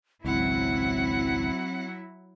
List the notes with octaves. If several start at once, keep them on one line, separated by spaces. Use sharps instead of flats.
G#1 C#2 F#3 C4 E4 F#5